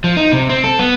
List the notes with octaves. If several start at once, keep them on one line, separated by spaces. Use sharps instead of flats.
F3
D#4
C3
C4
A4
B3